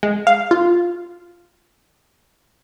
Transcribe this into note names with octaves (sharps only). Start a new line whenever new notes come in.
G#3
F5
F4